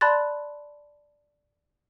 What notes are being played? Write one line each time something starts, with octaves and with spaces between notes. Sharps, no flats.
D5 A5 B5 C6 F#6 A6